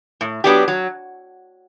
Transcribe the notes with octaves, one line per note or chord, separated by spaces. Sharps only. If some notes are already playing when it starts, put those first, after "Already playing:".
A2
F#3 B3 D4 G4
F#3